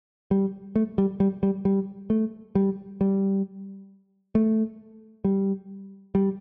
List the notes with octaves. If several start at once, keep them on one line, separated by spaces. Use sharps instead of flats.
G3
A3
G3
G3
G3
G3
A3
G3
G3
A3
G3
G3